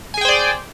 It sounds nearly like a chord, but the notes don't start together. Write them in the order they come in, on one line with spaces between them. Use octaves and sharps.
G#5 G#4 G5 C5 D5